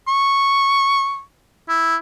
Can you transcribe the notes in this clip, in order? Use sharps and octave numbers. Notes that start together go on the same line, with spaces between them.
C#6
E4